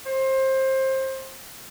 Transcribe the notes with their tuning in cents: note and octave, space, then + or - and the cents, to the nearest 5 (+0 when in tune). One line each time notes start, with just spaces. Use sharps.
C5 +25